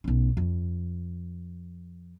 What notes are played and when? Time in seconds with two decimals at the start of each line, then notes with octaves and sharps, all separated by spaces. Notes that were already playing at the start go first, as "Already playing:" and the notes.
0.04 B1 C#4
0.37 F2